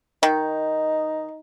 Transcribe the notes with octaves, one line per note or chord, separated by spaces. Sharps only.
D#3 D#4